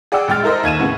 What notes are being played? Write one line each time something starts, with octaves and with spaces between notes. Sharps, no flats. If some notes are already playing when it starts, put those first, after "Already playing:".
G#4 D5 F#5 G5 E6
A#1 G#3 G5 F6 A6
E4 A4 A#4 C5 D#5
D#2 G#6 D#7 E7
A2 C#3 B3